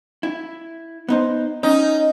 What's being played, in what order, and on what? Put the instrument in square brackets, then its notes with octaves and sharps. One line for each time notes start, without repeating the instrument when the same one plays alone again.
[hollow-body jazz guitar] E4
B3 D#4 C5
[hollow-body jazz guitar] C#4 [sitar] D#4